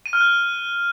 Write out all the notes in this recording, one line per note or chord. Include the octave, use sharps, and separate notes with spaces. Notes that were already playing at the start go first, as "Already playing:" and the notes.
D#7
F6
F#6